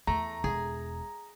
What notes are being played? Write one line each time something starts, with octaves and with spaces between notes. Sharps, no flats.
E2 A3 A#5
E1 G#4